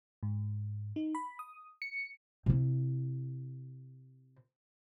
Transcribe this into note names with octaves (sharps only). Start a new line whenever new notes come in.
G#2
D#4
B5
D#6
C#7
C3 E4